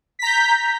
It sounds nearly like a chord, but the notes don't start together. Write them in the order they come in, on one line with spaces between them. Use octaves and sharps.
B6 A#5 G6